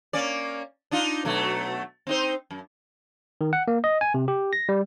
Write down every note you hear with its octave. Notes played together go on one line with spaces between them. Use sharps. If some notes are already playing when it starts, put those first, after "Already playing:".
A#3 C#4 D5
D4 D#4 F4
B2 F#3 A3
C4 D#4 C5
F#2
D#3
F#5
A#3
D#5
G#5
C3
G4
A#6
G3